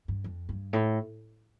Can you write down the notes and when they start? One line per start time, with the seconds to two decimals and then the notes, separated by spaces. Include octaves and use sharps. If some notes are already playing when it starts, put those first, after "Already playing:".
0.08 G2
0.24 F2
0.49 G2
0.73 A2